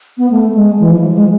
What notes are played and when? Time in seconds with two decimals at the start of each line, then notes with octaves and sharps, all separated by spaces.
0.18 B3
0.30 A3
0.54 G#3
0.79 E3
0.91 F3
1.03 F3
1.15 G#3